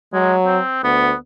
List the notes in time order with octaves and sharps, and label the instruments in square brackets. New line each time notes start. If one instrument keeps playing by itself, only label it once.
[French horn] F#3 [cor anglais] G#3
[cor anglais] C4
[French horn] D2 [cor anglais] B3